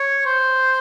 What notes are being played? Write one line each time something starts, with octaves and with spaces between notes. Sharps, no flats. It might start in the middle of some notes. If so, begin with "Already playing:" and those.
Already playing: C#5
C5